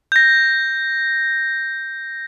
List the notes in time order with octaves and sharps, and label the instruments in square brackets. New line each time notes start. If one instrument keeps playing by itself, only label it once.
[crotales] G6 A#6